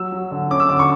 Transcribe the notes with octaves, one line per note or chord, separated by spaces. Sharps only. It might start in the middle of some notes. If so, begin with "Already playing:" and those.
Already playing: F#3 E6
F#3
D3
C#4 D6
E6
D3 D6
C#6